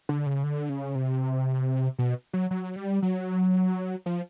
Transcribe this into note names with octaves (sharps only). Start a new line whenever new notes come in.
D3
C#3
D3
C#3
C3
B2
F#3
F#3
G3
F#3
F3